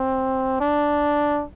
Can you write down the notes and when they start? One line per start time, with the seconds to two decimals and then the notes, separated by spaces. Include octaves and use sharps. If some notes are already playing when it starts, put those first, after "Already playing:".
Already playing: C4
0.61 D4